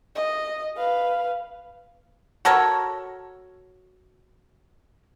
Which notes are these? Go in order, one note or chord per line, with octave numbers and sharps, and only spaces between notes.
D#5
B4 F5
F#4 A4 A#4 C#5